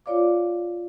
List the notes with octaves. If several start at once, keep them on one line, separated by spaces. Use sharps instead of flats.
F4 C#5 D5 F5 D6